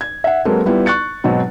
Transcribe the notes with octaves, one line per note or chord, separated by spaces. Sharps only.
G#6
E5 F#5
F#3 G#3 A#3 C4 A4 B4
G3 B3 E4 F4 G4
C#6 F#6 A6 C#7
G#2 B2 F#3 C4 D#4